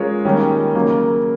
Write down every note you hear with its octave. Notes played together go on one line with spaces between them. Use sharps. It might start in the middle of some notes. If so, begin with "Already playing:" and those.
Already playing: G#3 C#4 F4 A#4 C#5
D#3 G3 A#3 C#4
C#3 F#3 A#3